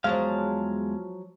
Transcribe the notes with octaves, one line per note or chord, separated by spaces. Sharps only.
E2 F3 F#3 G#3 D#5 F5